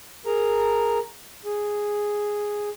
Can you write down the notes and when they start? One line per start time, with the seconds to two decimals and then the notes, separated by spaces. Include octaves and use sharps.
0.26 G#4 A#4 A#5
1.45 G#4